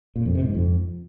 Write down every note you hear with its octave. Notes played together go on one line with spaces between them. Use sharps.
A#2
F2
C3
G#2
F2